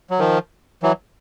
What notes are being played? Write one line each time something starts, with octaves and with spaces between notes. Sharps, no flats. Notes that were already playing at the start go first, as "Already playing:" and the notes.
F#3
D#3 F3
E3 F#3